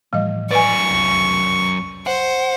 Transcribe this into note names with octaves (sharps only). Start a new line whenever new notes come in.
A2 E3 F3 G3 D#5
F#2 B4 D5 G#5 C#6
C2 F2
C5 F#5